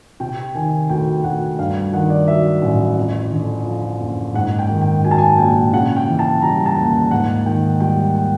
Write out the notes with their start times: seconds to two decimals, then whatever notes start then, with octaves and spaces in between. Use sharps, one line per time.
0.20 C3 G5
0.55 D#3 G#5
0.89 D2 G5
1.24 D2 F#5
1.58 G2 F5
1.93 D#3 F#5
2.10 D5
2.27 F#3 E5
2.62 A1
2.97 F2
3.32 D3
3.65 F3
4.01 F#1
4.34 G#2 F#5
4.59 G5
4.70 D#3
4.81 G5
5.03 F#3 G#5
5.11 A5
5.18 G#5
5.38 A#1 G5
5.73 C#3 F#5
5.96 G5
6.07 E3
6.19 A5
6.42 G3 A#5
6.66 A5
6.77 D#2
7.11 G#2 F#5
7.46 D#3 G5
7.80 G3 G5
8.15 G5